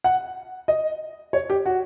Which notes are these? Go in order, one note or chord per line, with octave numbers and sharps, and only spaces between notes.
F#5
D#5
C#5
G4
F#4